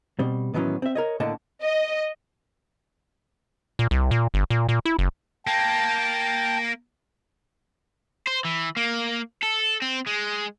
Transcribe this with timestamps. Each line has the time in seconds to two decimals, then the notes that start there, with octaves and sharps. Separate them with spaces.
0.19 B2 G3 C4
0.54 A2 D#3 E3 F#3 B3 C#4
0.82 C4 E5
0.95 A#4 C#5 D#5
1.20 A2 D3 A#3 D#5 F#5 A5
1.63 D#5
3.79 A#2
3.91 C2
4.11 A#2
4.34 G1
4.50 A#2
4.69 A#2
4.85 E4
4.99 F#1
5.47 A#3 G5 A5
8.27 C5
8.45 E3
8.77 A#3
9.43 A4
9.82 C4
10.07 G#3